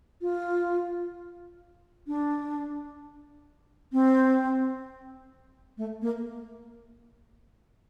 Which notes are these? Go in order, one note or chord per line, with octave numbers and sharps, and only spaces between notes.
F4
D4
C4
A3
A#3